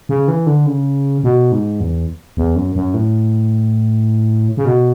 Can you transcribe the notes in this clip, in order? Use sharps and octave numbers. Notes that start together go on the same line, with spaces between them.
C#3
E3
D3
C#3
B2
G#2
E2
E2
F#2
F#2
A2
C#3
B2